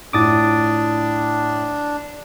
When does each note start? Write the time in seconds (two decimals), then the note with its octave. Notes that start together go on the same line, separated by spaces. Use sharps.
0.13 A2 D4 F4 D6 D#6 A6